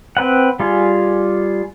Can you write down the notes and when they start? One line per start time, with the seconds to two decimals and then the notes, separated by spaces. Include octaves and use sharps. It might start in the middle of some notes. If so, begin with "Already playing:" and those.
0.17 C4 B4 F#5
0.60 G3 F4 G#4